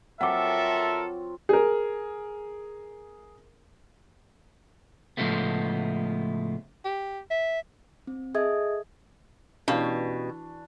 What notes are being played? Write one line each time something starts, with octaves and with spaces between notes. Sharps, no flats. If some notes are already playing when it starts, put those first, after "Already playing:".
F#3 C4 F4 A4 A#4 E5 F#5 D6
G#4 A#4
A2 C#3 F3 G#3 A3 B3
G4
E5
C4
G#4 A4 D#5 E5 D#6 G#6
B2 E3 C#4 D4 G4 F5